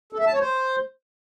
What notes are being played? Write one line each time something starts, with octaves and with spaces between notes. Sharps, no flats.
A4
E5
A5
C#5
C5